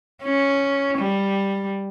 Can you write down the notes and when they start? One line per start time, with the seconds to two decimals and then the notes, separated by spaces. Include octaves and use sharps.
0.24 C#4
0.98 G3